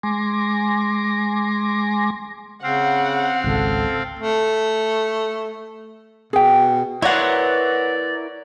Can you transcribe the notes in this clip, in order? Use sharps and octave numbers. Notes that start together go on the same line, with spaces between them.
G#3 G#5 C6 D6 A#6
C#3 C4 F5 F#5
G#1 C#2 A4
A3
B2 G#4 G5
F#3 B3 E4 A#4 C#5 D5 F#5 C6